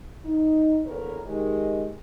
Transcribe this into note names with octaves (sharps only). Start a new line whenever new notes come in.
D#4
E2 A#2 D3 A#4 B4 C#5
D#3 G#3 G4